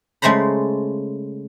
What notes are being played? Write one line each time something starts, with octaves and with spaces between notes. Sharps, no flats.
C#3 G#3 A3 C5 A#5 B5